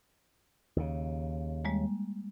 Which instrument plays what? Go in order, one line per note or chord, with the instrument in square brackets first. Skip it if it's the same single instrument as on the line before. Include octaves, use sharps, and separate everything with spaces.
[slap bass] D#2 C#3
[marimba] G3 G#3 A#3